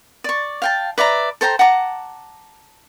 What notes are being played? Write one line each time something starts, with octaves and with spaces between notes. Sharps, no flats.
D5 C#6
F5 G5 A5
B4 D5 E5 A#5
A4 C5 G5 A#5
F#5 A5 A#5 D6